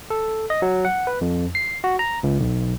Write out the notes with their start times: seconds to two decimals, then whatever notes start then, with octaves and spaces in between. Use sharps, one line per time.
0.10 A4
0.50 D#5
0.62 F#3
0.85 F#5
1.07 B4
1.21 F2
1.55 C7
1.84 F#4
1.99 A#5
2.23 C#2
2.40 B1